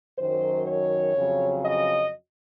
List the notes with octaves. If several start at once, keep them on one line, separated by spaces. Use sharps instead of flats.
F#2 D#3 F#3 C5
C#5
F2 C#3 F#3
D#5